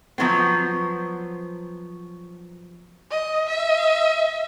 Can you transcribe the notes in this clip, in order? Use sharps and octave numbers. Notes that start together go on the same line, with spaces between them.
F3 F#3 B3 C4
D#5
E5